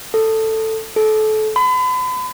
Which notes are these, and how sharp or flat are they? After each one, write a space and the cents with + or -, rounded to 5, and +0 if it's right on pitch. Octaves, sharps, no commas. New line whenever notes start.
A4 +10
A4 -25
B5 +40